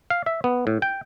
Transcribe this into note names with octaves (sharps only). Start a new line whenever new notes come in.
F5
E5
B3
A2
G5